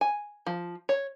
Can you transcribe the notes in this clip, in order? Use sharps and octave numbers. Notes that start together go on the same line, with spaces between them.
G#5
F3
C#5